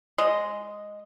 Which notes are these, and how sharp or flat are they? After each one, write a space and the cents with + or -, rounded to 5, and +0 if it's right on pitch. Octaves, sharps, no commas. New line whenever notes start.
G#3 +0 D#5 +0